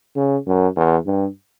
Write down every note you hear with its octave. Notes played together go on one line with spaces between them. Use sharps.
C#3
F#2
E2
G2